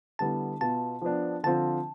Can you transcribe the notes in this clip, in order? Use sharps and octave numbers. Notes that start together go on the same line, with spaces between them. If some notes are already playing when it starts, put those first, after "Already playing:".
D3 G3 B3 E4 A5
B2 B3 F4 A5
F3 B3 D4
D3 F3 C4 F4 A5